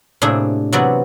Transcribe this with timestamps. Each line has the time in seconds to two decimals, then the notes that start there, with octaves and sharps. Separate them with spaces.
0.22 A2 C3 A#3 D4 G#4
0.73 C3 E3 F#3 B3 F#4 D5